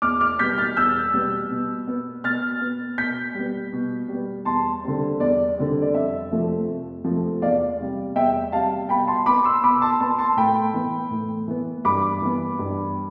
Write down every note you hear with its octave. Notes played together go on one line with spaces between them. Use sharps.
E2 D6 F6
D6 F6
B2 G3 B3 G6 B6
F6 A6
E2 E6 G6
B2 G3 B3
B2
B3
B2 F6 A6
B3
B2 G6 B6
G3 B3
B2
G3 B3
E2 A5 C6
D3 G3 C4
E2 D5
D3 G3 C4
D5
F2 E5
C3 F3 A3 C4
F2
C3 F3 A3 C4
E2 D5 F5
C3 G3
E2 E5 G5
C3 G3 F5 A5
B2 G5 B5
A5 C6
B3 B5 D6
C6 E6
B2 B5 D6
A5 C6
B3 A5 C6
A5 C6
A2 G5 B5
E3 B3
A2
E3 B3
G2 B5 D6
E3 B3
G2